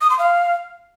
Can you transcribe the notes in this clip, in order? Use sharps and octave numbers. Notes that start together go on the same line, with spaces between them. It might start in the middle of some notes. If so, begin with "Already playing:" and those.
D#6
C6
F5